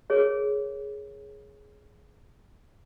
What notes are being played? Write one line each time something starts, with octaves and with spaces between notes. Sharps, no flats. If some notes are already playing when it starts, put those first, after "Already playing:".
G#4 A#4 C#5